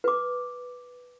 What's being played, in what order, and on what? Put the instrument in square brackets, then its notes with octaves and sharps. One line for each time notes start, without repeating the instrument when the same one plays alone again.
[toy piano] B4 D6